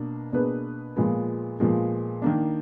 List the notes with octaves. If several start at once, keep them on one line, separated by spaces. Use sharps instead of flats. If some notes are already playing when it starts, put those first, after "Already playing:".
Already playing: B2 A#3 D4
B2 A#3 D4 G#4 B4
A#2 F3 G#3 B3
A#2 F3 G#3 B3
D#3 A#3 D4